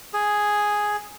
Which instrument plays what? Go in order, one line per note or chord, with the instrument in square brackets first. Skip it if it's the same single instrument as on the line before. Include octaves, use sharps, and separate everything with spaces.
[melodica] G#4